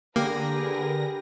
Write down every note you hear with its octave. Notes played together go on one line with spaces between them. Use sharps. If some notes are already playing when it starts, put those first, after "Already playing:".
D3 A#3 G4 G#4 A#4 B4 A#6